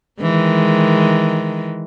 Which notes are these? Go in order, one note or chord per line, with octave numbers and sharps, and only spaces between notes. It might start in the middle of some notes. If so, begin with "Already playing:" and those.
D#3 E3 G#3